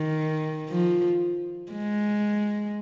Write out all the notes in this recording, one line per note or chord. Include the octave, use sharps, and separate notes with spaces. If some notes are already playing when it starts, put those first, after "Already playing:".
Already playing: D#3
F3
G#3